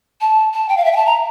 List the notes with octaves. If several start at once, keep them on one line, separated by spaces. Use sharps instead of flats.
A5
A5
G5
F5
E5
G5
A5
A#5